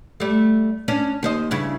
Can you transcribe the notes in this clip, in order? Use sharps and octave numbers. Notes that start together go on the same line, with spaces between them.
G3 A3
C#4 D4
D#2 C5 D#5
G2 C#3 E4